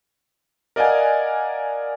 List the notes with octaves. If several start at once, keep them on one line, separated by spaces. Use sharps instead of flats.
A#4 D5 D#5 F5 F#5 G#5